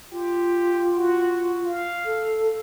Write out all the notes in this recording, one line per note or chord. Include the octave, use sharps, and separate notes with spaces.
F4 G4
F#4
F5
A4